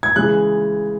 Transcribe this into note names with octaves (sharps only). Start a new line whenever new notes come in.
G#6
C#3 E3 G#3 F#6